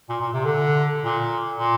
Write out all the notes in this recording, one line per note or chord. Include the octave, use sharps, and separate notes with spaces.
A#2
A#2
C3
D3
A#2
A#2